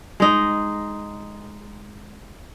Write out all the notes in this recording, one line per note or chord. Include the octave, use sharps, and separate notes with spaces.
G#3 D#4